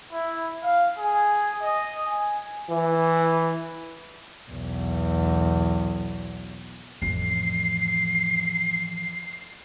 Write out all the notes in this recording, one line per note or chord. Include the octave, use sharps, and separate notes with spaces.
E4
F5
G#4
D#5
G#5
E3
B1 E2
A1 F2 C7